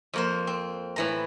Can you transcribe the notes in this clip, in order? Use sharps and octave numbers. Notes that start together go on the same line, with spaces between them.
F2 A#3 C5
C4
A2 E3 A#5